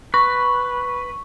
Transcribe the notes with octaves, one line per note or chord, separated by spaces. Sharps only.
B4 C#6